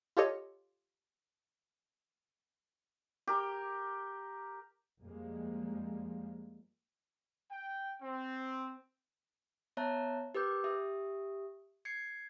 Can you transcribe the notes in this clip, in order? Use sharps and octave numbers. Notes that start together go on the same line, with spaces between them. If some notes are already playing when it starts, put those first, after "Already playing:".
F4 G4 A4 C#5 D#5
G4 A#4
F2 F3 G3 G#3 A#3
G5
C4
B3 C#5 E5 A5 A#5 F#6
G4 A#4 B4 D6 G6
G4 E5 D#6
G#6 C7 C#7